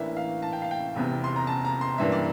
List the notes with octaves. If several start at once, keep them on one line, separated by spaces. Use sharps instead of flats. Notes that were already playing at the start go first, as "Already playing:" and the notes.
Already playing: A1 A2 E3 A#3 D4 E5
F5
A5
G5
F5
G5
F1 E2 C3
C6
A#5
A5
A#5
C6
G2 E3 A#3 D4 E5
D5